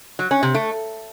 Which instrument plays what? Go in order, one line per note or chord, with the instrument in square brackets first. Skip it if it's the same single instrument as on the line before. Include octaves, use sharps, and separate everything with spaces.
[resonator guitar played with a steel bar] F#3
C#4
C3
A3